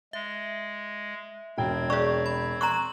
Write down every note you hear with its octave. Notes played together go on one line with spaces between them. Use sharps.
G#3 E5
E1 C4 G5 G#6
G#4 C#5 D5 C#6
B5
A#5 C6 C#6 F#6 F#7